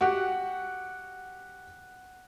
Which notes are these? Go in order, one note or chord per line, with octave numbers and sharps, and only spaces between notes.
F#4 G4 F#5